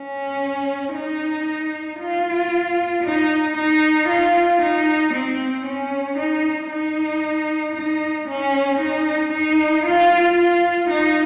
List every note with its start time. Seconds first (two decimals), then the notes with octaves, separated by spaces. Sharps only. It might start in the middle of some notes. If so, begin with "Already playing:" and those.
Already playing: C#4
0.95 D#4
2.00 F4
3.04 D#4
3.57 D#4
4.09 F4
4.62 D#4
5.14 C4
5.66 C#4
6.18 D#4
6.70 D#4
7.75 D#4
8.28 C#4
8.80 D#4
9.33 D#4
9.85 F4
10.37 F4
10.90 D#4